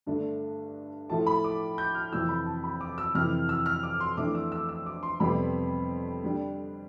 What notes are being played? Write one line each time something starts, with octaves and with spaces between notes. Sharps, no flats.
G2 D3 A3 D4
A2 F3 A3 A5
B5
D6
G6
F6
F2 C3 E3 E6
B5
A5
B5
D6
E6
F2 C3 E3 F6
E6
F6
D6
C6
F2 E3 A3 D4 D6
E6
E6
E6
D6
C6
F2 C3 G3 B3 B5
D3 G3 D4